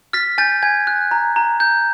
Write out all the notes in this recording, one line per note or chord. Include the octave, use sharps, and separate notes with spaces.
F6 A6 B6
G#5 G6 A6
G#5 G#6
F#6
A#5
A#5
G6